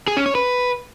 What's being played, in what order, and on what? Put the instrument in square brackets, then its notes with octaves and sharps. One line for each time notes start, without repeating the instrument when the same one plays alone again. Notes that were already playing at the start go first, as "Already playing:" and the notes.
[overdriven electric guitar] G#4
C#4
C#5
B4